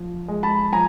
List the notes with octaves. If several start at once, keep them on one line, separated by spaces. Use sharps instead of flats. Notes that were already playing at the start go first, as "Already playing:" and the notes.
Already playing: F3
G#3
A5 B5
F3 G#5 A#5